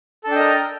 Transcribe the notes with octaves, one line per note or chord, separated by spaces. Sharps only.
D4 A4 A#4 D#5 G5